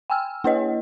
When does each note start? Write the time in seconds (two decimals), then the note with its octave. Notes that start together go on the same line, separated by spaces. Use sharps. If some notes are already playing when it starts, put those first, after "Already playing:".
0.10 G5 G#5 E6 F6
0.44 A#3 E4 B4 C#5 D#5